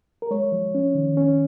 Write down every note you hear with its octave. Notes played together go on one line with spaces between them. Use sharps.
A#4
G#3 C#5
F3
C#4
D#3
C#4